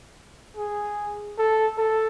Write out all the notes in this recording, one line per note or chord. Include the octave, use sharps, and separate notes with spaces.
G#4
A4
A4